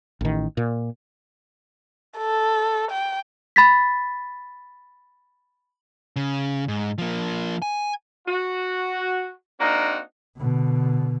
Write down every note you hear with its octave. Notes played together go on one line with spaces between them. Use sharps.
A1 D#3
A#2
A4
G5
B5 A6 B6
C#3
G#2
F3 A#3
G#5
F#4
A#3 C4 D4 D#4 F#4
B2 D3